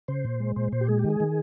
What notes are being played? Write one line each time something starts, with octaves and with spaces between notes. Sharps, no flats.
C#3 C5
A#2
G#3
A#2 C5
A#2 C5
G4
G#3 G#4
G4
D#3
G#4
D#3